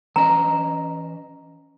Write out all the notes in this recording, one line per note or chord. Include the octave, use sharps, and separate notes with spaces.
E3 C#4 D#5 A#5